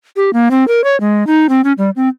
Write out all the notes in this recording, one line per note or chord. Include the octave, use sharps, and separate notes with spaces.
G4
A#3
C4
A#4
C#5
G#3
D#4
C4
C#4
G3
C4